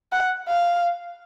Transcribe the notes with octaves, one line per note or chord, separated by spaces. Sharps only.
F#5
F5